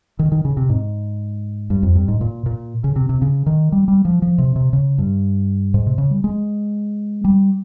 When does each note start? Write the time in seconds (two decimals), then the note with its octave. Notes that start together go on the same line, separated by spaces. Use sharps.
0.19 D#3
0.32 D#3
0.45 C#3
0.57 C3
0.69 G#2
1.70 G2
1.83 F2
1.95 G2
2.08 G#2
2.21 A#2
2.46 A#2
2.84 C#3
2.96 C3
3.09 C3
3.22 C#3
3.46 D#3
3.72 G3
3.88 G3
4.05 F3
4.22 F3
4.38 C3
4.56 C3
4.73 C#3
4.98 G2
5.74 G#2
5.87 C3
5.98 C#3
6.11 G3
6.24 G#3
7.25 G3